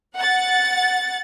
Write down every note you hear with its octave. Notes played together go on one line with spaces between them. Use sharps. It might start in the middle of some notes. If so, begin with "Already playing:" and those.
F#5 A6